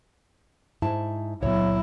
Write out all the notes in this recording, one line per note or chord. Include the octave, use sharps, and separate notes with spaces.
G#2 E4 A5
C#2 A#2 F#3 B3 E4 C#5